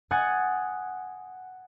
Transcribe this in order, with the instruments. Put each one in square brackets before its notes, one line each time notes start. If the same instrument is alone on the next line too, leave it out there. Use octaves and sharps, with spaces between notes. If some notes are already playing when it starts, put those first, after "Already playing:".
[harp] F#5 G#5 D#6 G#6 A6 C#7